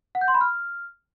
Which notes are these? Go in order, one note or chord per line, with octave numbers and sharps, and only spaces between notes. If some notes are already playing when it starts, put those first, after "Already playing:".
F#5
G6
C6
B5
F6